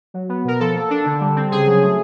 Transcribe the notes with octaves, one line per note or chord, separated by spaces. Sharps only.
F#3
B3
B2 A#4
F3 A4
A#3
D4
D3
G3
C4
C#3 G#4
F#3
A3